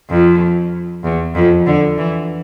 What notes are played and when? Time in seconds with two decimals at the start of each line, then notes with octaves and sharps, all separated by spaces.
0.09 F2
1.04 E2
1.35 F2
1.66 D3
1.98 E3